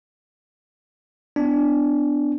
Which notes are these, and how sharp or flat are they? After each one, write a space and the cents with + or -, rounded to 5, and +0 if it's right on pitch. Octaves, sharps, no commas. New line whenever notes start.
B3 +25 D4 +0